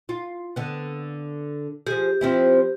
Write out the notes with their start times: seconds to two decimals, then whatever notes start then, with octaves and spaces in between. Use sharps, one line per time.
0.09 F4
0.56 D3 B3
1.87 F3 G4 G#4
2.21 F3 C4 E4